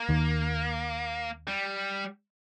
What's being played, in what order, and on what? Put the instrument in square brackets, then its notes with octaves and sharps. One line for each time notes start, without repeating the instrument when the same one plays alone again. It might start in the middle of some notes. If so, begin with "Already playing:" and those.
Already playing: [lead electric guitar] A#3
[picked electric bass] D#2 D#3
[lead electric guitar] G3